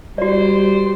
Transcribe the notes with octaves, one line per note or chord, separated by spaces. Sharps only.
G3 F#4 C5 D5